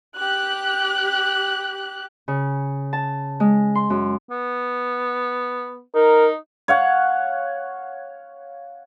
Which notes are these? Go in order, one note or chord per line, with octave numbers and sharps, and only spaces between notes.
G4 F#6
C#3
A5
G#3
C6
F#2
B3
D#4 A#4
C#5 F5 F#5